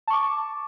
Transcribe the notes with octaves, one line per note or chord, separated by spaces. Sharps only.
A5 C#6 D6